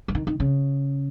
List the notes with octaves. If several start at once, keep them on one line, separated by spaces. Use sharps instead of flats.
F3
D#3
D#3
C#3